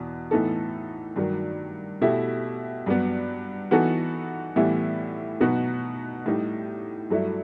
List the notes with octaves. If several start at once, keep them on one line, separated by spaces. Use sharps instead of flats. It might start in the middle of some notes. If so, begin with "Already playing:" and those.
Already playing: E2 B2
A2 E3 B3 D#4 A4
G2 D#3 F#3
B2 A3 E4 G4
G2 F#3 B3
E3 B3 D#4 F#4 A4
A2 E3 G3 B3 E4
B2 F#3 B3 D#4 F#4
A2 G3 D#4 G4
G2 F#3 A3 E4